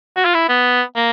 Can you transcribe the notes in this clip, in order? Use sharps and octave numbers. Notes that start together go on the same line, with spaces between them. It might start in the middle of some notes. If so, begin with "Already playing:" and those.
F#4
F4
E4
B3
A#3